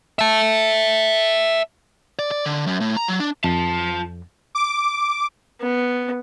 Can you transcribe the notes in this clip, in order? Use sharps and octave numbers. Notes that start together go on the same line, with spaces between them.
E5 A5
D5
D5
D3
F#2
A2
A#5
F#3
D4
F2 F4 A5
D6
B3